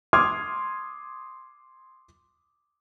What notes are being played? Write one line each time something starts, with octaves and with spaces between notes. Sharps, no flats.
C6 D6 D#6 F6 G#6